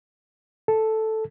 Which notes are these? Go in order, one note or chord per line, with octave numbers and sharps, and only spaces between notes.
A4